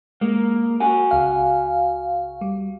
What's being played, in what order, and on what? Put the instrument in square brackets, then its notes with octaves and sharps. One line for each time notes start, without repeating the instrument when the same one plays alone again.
[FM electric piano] G#3 [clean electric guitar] A#3
[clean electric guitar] F#4 F#5 G#5
[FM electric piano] C#2 F5
G3